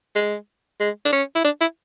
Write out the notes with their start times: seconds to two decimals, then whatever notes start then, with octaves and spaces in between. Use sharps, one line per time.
0.16 G#3
0.80 G#3
1.05 D4
1.13 C#4
1.35 E4
1.45 D4
1.61 E4